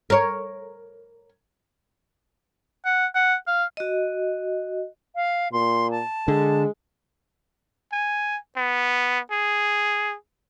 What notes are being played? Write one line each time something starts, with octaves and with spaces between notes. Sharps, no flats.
A#4 C#5
F#5
F#5
F5
F#4 D#5
F5
A#2 C6
A5
D3 G#3
G#5
B3
G#4